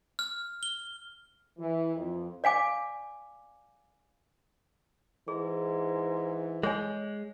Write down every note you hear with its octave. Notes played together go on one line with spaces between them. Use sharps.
F6
G7
E3
F2
D5 F5 G#5 D6
G#2 E3 G#4
G#3 G#4 C#5 G#5